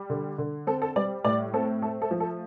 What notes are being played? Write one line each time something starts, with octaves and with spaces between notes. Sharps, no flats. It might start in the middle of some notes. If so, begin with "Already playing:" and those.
Already playing: G3
D3
D3
C4 A4
A4
G3 D5
A2 D5
C4 A4
A3 A4
A4
F3
A4